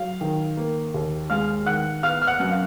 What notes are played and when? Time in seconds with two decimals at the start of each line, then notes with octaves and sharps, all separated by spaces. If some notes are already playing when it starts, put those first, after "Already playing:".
Already playing: F#3 F5
0.21 D#3
0.57 A#3
0.94 D#2
1.30 G#3 F5 F6
1.66 D#3 F#5 F#6
2.03 B3 F5 F6
2.22 F6
2.27 F#5 F#6
2.40 F#2
2.51 F5